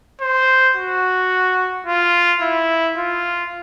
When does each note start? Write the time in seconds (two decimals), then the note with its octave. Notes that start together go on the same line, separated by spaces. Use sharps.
0.21 C5
0.76 F#4
1.87 F4
2.42 E4
2.97 F4